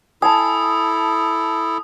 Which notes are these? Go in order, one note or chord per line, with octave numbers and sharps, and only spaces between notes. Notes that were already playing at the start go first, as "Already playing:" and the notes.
E4 A4 G#5 A5 D#6